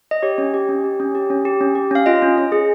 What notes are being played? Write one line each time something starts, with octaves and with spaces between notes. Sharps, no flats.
D#5
G4 C#5
C#4
G4
C#4
G4
C#4
G4
C#4
G4
C#4
G4
C#4 F5
F4 D#5
C#4
C#4
G#4